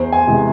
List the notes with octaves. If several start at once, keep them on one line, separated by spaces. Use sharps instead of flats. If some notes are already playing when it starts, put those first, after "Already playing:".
Already playing: E2 C5
G#5
C3 E3 G#3